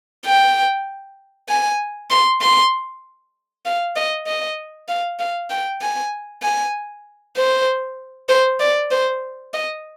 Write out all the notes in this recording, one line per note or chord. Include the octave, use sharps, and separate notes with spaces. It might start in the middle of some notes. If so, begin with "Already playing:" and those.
G5
G#5
C6
C6
F5
D#5
D#5
F5
F5
G5
G#5
G#5
C5
C5
D5
C5
D#5